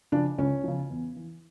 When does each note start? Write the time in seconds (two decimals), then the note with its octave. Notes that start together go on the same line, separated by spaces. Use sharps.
0.12 C#3 F3 D4
0.38 C#2 C#4
0.64 C#3 F3
0.90 E2
1.16 E3